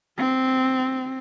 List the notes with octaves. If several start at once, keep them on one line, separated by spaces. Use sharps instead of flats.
C4